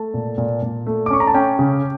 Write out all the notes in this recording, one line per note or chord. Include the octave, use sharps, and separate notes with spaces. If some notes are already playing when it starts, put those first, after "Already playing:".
Already playing: A3 A5
A#2
A#2
A#2
A3
D6
C#4 C#6
A#5
A5
C#4 G5
C#3